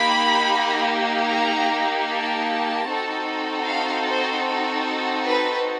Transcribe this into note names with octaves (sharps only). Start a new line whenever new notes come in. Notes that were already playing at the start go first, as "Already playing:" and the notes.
Already playing: A#3 D#4 G4 B5
A#5
A5
C4 D#4 F#4 A4
F5
C5
B4